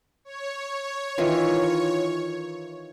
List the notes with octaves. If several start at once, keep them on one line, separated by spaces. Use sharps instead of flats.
C#5
D#3 E3 F4